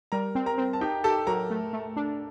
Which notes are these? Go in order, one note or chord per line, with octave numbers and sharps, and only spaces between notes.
G3 A#4 A#5
C4
A#4 A#5
C4
A5
D#4 G4 G5
G4 A4 A5
F#3 A#4 A#5
A3
A3
D4